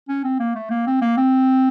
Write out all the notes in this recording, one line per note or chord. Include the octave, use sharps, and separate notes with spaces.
C#4
C4
A#3
A3
A#3
C4
A#3
C4